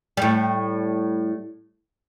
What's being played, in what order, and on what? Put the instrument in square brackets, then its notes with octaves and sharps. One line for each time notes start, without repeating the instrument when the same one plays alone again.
[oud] A2 G3